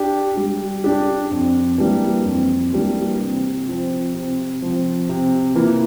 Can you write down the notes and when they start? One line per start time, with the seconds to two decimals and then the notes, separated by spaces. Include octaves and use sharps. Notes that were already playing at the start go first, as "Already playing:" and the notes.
Already playing: D4 G4
0.37 G3
0.84 D4 G4
1.31 F2
1.78 E3 G3 A#3 D4
2.25 F2
2.73 E3 G3 A#3 D4
3.21 C3
3.67 F3 C4
4.14 C3
4.62 F3 C4
5.09 C3
5.55 E3 A#3 F4